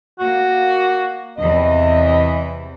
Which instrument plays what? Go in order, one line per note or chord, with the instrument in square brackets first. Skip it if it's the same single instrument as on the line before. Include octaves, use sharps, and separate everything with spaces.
[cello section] A#3 [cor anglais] F#4
[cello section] E2 C3 E3 [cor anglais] D#5